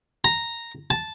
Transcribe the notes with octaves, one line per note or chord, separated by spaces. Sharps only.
A#5
A5